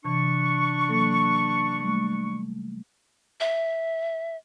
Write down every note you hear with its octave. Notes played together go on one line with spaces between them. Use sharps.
C3 E3 D4 C#6
F#3 A#3 A4
G3 A3
E5